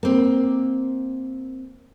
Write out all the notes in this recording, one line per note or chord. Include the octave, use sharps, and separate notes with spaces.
A#3 C4